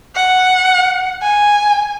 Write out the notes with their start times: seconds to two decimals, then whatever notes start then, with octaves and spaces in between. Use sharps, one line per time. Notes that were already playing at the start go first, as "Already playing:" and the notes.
0.16 F#5
1.22 G#5